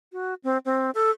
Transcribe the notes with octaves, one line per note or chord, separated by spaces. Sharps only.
F#4
C4
C4
A4